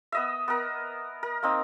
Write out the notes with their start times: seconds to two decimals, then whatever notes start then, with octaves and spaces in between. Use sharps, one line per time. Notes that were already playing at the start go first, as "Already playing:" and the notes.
0.12 B3 D#5 E5
0.48 B3 A#4
1.23 A#4
1.43 A#3 C4 D#4